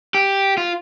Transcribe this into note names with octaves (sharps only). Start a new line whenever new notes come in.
G4
F4